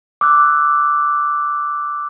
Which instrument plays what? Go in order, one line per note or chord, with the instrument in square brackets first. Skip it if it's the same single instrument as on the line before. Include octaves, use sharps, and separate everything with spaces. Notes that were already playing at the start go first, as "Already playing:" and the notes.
[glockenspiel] D6 E6 F#6